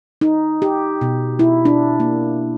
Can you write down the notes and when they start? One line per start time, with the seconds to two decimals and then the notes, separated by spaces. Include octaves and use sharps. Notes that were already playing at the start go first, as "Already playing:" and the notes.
0.21 D#4
0.62 G4
1.01 B2
1.39 E4
1.65 D4
2.00 A#3